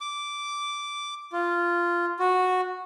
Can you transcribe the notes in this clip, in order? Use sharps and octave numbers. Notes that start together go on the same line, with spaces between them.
D6
F4
F#4